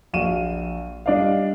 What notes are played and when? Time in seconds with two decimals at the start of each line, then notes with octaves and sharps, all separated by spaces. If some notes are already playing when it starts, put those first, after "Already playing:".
0.13 A#1 F#4 F5 D#7 E7
1.06 G3 D4 D5 D#5 F5